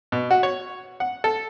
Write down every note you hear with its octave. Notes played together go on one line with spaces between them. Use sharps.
B2
F#4
C#5
F#5
A4